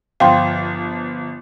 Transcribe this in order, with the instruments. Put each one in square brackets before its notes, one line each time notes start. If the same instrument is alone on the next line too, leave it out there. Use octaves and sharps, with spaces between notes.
[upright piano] G1 F3 [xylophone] F5 G5 C6